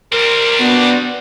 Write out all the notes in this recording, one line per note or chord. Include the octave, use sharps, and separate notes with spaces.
G3 C4 A#4
B3 D4 F#4 D5